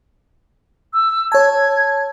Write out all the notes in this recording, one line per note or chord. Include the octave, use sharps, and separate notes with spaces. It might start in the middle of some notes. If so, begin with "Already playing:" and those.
E6
C#5 A5 G#6